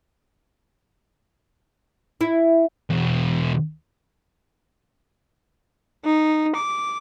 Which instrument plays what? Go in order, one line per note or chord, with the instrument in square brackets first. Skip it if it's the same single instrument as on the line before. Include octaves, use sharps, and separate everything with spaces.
[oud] E4
[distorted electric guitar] E2 B2
[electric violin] D#4
D6